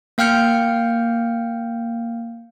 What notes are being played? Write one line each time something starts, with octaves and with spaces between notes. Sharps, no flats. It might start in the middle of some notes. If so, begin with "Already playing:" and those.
A#3 F5 G5 F6 G6 C#7